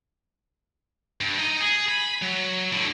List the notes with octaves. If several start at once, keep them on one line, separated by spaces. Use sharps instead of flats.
G2
D#4 D#5
G#4
B5
F#3
A2 D3